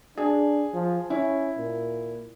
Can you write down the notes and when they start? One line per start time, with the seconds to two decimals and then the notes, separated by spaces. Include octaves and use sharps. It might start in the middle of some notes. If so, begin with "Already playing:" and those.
0.17 D4 G#4
0.74 F3
1.10 C#4 E4
1.57 A#2